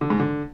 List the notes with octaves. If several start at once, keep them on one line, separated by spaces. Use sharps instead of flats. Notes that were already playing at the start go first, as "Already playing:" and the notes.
D3
G#2
D3